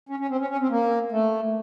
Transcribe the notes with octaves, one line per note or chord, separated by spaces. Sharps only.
C#4
C#4
C4
C#4
C#4
C4
A#3
A3